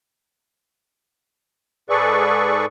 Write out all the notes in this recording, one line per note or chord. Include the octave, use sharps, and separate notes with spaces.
G#2 G#4 A4 B4 D5 C#6